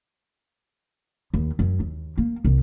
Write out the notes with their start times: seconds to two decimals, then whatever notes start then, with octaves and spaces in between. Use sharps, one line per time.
1.34 D#2
1.59 F#2
1.80 D#2
2.18 A#3
2.44 C2